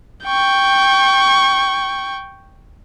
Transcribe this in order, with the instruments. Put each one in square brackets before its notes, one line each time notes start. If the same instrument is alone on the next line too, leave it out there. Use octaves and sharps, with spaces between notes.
[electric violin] G5 C#6